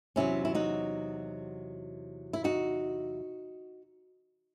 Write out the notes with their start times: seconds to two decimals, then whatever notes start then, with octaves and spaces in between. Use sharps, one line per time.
0.16 E2 C3 D#3 F#3 C#4 E4
0.45 E4
0.55 D#4 F#4
2.33 E4
2.44 D#4 F#4